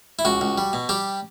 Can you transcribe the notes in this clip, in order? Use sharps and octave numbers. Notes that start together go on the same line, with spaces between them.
E4
C#2 F#4
C#2
G3
B2
G3 G4